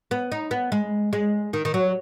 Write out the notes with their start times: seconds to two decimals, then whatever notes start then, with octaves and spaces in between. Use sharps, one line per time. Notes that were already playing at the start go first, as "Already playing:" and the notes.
0.11 B3
0.32 D#4
0.51 B3
0.72 G#3
1.13 G#3
1.53 D#3
1.65 D#3
1.74 F#3